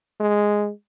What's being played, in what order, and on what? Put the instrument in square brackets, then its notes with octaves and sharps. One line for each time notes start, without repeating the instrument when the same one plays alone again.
[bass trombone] G#3